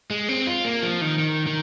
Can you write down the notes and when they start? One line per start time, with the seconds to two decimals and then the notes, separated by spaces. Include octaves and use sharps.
0.10 G#3
0.29 C4
0.47 F4
0.65 A#3
0.82 F3
1.01 D#3
1.19 D#3
1.47 D#3